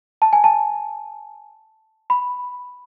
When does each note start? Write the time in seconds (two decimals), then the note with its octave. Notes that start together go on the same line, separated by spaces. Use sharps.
0.22 A5
0.33 G#5
0.44 A5
2.10 B5